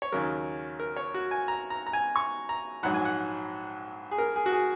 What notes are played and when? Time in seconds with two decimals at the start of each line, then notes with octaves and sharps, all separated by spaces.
0.02 C#5
0.12 D#2 C#3 F#3 A#4
0.80 A#4
0.96 C#5
1.14 F#4
1.31 G#5
1.48 A#5
1.70 A#5
1.87 A#5
1.93 G#5
2.16 C#6
2.49 A#5
2.83 A#1 G#2 F#3 F#5
2.94 G#5
3.05 F#5
4.11 G#4
4.18 A#4
4.36 G#4
4.46 F#4
4.53 G#4